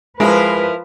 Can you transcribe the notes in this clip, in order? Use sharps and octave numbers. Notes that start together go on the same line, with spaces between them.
F3 G#3 E4 A#4 B4